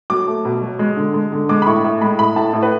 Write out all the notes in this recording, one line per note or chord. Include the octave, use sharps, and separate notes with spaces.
F#3 D6
A3
B2
F#3
G#3
D3
G#3
D3
G#3 D6
B5
A2 C#6
A2
G#3 B5
A2 B5
A2 A5
A2
B4